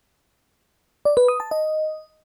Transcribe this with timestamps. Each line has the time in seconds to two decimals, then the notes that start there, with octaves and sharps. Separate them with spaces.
1.05 D5
1.17 B4
1.28 D#6
1.40 A5
1.51 D#5